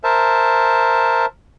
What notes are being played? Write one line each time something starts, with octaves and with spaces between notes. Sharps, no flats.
A#4 C5 E5 A5